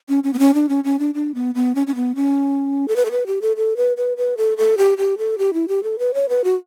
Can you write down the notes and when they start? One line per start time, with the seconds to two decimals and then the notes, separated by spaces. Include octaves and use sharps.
0.09 C#4
0.24 C#4
0.33 B3
0.39 C#4
0.54 D4
0.69 C#4
0.84 C#4
0.99 D4
1.14 D4
1.35 B3
1.55 B3
1.75 C#4
1.87 C#4
1.95 B3
2.16 C#4
2.88 A4
2.96 B4
3.05 A4
3.11 B4
3.27 G4
3.42 A4
3.57 A4
3.77 B4
3.97 B4
4.17 B4
4.37 A4
4.57 A4
4.78 G4
4.98 G4
5.18 A4
5.38 G4
5.53 E4
5.68 G4
5.83 A4
5.99 B4
6.14 C#5
6.29 B4
6.44 F#4